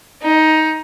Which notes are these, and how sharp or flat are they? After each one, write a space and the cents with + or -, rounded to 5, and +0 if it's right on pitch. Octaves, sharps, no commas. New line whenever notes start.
D#4 +15